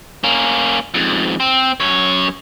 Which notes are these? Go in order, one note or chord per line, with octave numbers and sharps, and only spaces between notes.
A#3 C#4
F2 G#2
C4
F#2 C#5